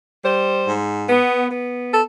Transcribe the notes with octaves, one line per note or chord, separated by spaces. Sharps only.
G3 C5
G#2
B3
B3
A4